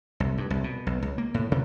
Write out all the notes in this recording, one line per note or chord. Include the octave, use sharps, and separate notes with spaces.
C2
G2
C2
B2
B1
C#2
A#3
A2
C3